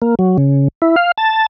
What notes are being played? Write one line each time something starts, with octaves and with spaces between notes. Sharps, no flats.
A#3
F#3
C#3
E4
F5
A5